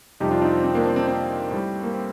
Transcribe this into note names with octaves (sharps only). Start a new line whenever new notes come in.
F2 C3 G3 D#4 G4
D4 F4
C4 D#4
C4
C4
A#3 D4
C4
C4
C4
A2 G3
A#3
C4